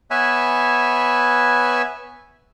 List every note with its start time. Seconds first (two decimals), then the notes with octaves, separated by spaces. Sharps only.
0.11 B3 B4 C#5 E5 G#5